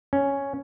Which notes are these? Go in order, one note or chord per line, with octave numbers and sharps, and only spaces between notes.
C#4